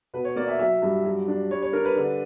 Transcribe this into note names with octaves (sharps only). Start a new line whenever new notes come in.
B2 B4
C#5
A#3 D5
E5
F#3 E5
G2
F#3
D4
G3 C#5
C#5
D4 A#4
B4
D3